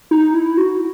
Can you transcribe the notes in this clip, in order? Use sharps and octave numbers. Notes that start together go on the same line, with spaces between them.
D#4
E4
F#4